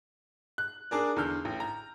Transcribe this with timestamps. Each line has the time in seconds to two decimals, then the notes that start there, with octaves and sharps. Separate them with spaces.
0.58 F#6
0.91 D4 G#4 A#4 D5
1.16 E2 D3 E6 F6 G6
1.45 A1
1.60 A#5